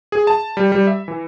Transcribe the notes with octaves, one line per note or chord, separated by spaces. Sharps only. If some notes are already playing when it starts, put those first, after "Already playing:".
G#4
A5
G3
G3
E5
E3